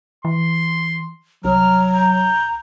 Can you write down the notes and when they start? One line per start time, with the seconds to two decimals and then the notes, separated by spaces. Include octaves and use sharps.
0.25 E3 C6
1.44 C2 F#3 A#5 F6
1.95 G6